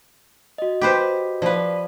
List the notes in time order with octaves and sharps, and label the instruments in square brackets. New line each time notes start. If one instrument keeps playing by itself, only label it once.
[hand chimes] F#4 D#5
[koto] G4 B4 C5
[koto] F3 B4 [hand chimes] D5 F5